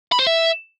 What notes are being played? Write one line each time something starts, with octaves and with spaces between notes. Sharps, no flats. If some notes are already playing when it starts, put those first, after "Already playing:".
B5
C5
E5